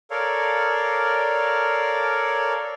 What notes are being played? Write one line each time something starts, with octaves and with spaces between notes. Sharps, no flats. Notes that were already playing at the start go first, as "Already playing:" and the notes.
A4 A#4 C#5 D5 F5